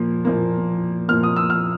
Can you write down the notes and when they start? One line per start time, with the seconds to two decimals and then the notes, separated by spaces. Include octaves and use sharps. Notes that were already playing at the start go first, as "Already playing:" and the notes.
Already playing: A#2 F3 A#3
0.25 A#2 F3 A#3
1.08 A#2 F3 A#3 F6
1.23 D#6
1.36 E6
1.50 F6